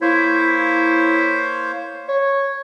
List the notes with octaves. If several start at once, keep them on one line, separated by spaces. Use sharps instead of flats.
A#3 E4 C5 C#5
C#5